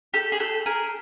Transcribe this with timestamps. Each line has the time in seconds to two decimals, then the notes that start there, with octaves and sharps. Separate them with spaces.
0.14 G4 A4
0.32 G#4
0.40 G4 A4
0.66 G#4 A#4